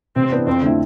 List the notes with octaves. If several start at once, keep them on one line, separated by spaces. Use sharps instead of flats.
C3 C4
E3 B3 D4
F2 C4
D3 A3 E4